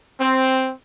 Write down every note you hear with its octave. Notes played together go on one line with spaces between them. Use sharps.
C4